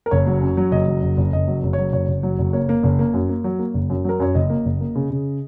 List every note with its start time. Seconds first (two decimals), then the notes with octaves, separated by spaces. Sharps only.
0.06 A#4
0.11 F#1 C#5
0.26 F#3
0.42 F#2
0.57 F#3
0.72 F#1 D#5
0.87 F#3
1.03 F#1
1.17 F#1
1.33 F#1 D#5
1.48 F#3
1.63 F#1
1.73 F#3 C#5
1.92 F#1 C#5
2.08 F#1
2.23 F#3
2.39 F#1
2.53 A#3 C#5
2.69 A#3
2.83 F#1
2.99 A#3
3.14 F#2
3.29 A#3
3.44 F#3
3.59 A#3
3.74 F#1
3.90 F#2
4.05 F#3 A#4
4.20 F#2 C#5
4.35 F#1 D#5
4.50 A#3
4.65 F#1
4.81 A#3
4.95 C#3
5.10 C#3